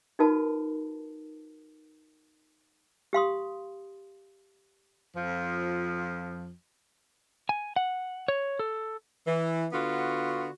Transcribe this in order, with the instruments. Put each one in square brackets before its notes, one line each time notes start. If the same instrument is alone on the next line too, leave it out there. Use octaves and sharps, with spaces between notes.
[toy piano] D#4 F4 F#4 A#4 B4 A5
G4 F5 C6 D#6
[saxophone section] F2 F3
[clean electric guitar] G#5
F#5
C#5
A4
[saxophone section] E3
D3 B3 F4 F#4